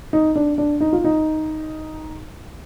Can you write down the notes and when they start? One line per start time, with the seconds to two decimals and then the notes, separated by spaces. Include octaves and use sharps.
0.13 D#4
0.35 D4
0.58 D4
0.80 D#4
0.93 F4
1.04 D#4